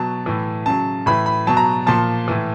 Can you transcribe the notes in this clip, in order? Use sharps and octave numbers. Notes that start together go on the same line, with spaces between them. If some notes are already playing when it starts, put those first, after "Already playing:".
Already playing: B2 F#3 A5
A2 E3
C#3 F#3 A5
A2 E3 B5
B5
B2 F#3 A5
A#5
A#2 F3 A5
A2 E3